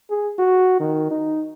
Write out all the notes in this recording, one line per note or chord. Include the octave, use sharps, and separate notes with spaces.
G#4
F#4
D#3
D#4